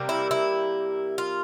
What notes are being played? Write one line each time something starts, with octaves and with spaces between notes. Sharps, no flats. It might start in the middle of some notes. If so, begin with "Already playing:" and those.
Already playing: C3 G3 A#3
E4
E4
F4